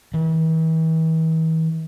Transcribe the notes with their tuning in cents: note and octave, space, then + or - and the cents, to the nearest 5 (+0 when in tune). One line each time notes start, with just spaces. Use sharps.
E3 -40